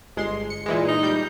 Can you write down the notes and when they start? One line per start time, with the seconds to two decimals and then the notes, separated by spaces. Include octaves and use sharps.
0.17 G1 G#3 C6
0.50 C#7
0.66 A#2 E3 G#3
0.88 D#4
1.03 G3 G6